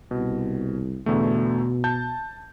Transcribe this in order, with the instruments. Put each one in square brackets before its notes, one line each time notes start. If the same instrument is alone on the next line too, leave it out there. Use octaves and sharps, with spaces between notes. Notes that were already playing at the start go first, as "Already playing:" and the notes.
[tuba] C2 [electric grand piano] B2
[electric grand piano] E2 D3 A3 [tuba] B2
[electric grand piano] A5 G6